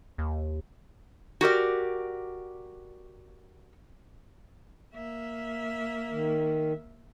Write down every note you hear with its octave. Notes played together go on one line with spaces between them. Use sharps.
D#2
F#4 G4 A#4 D5
A#3 E5
D#3